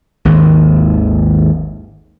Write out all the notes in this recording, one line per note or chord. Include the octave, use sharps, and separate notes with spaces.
G#1 D#2